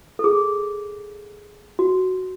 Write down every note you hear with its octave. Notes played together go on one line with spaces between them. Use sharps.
A4
G#4
F#4